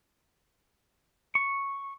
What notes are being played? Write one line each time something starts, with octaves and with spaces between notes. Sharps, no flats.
C#6